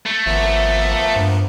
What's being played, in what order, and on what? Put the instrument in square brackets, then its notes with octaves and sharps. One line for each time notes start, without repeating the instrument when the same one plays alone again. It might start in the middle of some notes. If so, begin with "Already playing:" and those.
[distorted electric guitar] A3
[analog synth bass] G#1 [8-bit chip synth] F3 A#3 B3 [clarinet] E5
[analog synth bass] G2